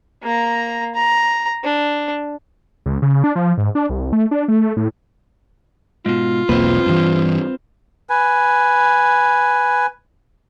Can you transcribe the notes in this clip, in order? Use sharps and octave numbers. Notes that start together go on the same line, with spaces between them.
A#3 A#5
A#5
D4
C#2
C#3
D4
F3
G#2
D4
C2
A3
D4
A3
A2
G#2 B2 F4
E1 B1 A#3 C4 B4
G2 E3
B4 G#5